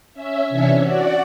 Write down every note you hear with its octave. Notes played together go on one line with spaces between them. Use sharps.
C#4 E5
C3 E3 C#4 D4 C#5 E5
F#4 D5 F#5